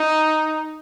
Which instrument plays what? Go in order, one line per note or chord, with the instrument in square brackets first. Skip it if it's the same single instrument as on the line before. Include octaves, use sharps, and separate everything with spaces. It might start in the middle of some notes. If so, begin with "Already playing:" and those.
Already playing: [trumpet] D#4